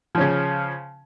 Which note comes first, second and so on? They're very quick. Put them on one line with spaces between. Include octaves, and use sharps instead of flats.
F3 C#4 C#3